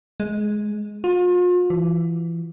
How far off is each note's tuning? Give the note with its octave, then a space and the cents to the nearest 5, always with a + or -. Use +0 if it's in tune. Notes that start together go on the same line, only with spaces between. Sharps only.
G#3 +15
F4 +40
E3 +30